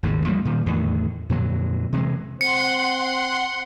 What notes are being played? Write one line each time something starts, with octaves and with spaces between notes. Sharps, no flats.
G#1 D#2 A2 C#3
F3 G3 A#3
A#2 D#3
E2 A2 D3 D#3
F2 A#2 D3 F#3
C3 E3 F#3 G#3
C4 F#5 C6 C#7